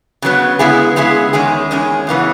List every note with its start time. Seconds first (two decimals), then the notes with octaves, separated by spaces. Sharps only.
0.22 C#3 F#3 B3
0.59 C#3 G#3 B3 E4 G#4
0.96 C#3 G#3 B3 E4 G#4
1.33 E2 D#3 G#3 C#4 G#4
1.71 E2 D#3 G#3 C#4 G#4
2.07 F#2 C#3 E3 B3